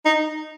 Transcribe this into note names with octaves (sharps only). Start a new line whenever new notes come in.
D#4